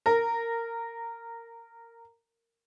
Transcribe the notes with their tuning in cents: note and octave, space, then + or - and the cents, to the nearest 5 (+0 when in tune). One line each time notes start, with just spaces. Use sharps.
A#4 -15